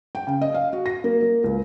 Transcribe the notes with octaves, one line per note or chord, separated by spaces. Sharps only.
G5
C#3
D#5
F5
F#4
A#6
A#3
A#3
C#2